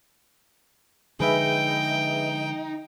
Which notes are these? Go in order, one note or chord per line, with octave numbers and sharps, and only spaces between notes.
D3 F3 G#3 D#4 G#4 B4 E5 G5